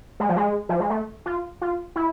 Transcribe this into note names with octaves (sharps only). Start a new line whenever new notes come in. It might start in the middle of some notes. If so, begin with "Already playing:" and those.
G#3
F3
G#3
F3
G#3
A3
F4
F4
E4